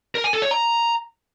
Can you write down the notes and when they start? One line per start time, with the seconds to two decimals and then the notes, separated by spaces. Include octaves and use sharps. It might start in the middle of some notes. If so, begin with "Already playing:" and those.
0.15 A#4
0.24 G#5
0.33 A4
0.42 C#5
0.51 A#5